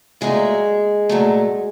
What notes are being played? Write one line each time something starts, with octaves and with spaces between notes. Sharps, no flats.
A#2 F#3 G#3 A3 G#4
A#2 F#3 A3